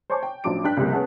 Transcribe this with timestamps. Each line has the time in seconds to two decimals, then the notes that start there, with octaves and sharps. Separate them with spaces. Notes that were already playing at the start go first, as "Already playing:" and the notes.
0.10 C5 C#5 G#5 A5 C#6 D6
0.23 G5
0.44 A1 F3 F#3 D4 D6 D7
0.64 G2 D4 G5 F#6 B6
0.77 C#2 C3 F3 G3 A#3
0.92 B3 C#4 G#4 F#5 A5